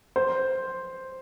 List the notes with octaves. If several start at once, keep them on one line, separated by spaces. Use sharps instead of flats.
C5